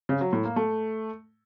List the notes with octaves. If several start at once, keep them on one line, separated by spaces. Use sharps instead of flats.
C#3
F#3
A2
A#3
A3